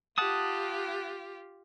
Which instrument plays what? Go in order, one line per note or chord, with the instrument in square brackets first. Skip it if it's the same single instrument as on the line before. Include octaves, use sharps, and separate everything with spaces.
[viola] F4 G4 [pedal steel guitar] F#5 A5 D#6